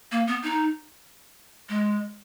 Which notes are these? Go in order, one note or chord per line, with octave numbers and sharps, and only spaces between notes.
A#3
B3
D#4
G#3